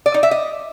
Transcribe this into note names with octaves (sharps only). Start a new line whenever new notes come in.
D5
D#4
E5
D#5